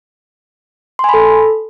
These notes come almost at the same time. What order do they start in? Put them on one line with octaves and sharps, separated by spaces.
C6 G#5 B5 A4